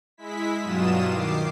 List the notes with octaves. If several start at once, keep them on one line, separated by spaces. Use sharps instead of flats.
G#3 E4 B6
G2 B2 F#3 F4 D#6 E7
D#3 D6 C7